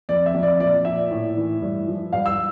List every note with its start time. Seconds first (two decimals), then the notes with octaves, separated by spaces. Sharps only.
0.09 F2 D5
0.26 E5
0.34 F2
0.43 D5
0.60 A#2 D5
0.85 A#2 E5
1.11 A2
1.37 E3
1.62 G2
1.87 F3
2.13 G2 F5
2.26 E6